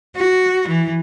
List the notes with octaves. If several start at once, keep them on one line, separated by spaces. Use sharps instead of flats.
F#4
E3